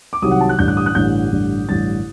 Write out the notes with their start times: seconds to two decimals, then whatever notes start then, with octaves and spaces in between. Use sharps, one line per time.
0.13 D6
0.22 C2 C3 D#3 F#3 D#6
0.31 F#5
0.41 A5
0.49 F#6
0.59 A1 G2 D3 G6
0.68 F#6
0.77 D#6
0.86 F#6
0.95 A1 G2 D3 G6
1.32 A1 G2 D3
1.68 A1 G2 D3 A6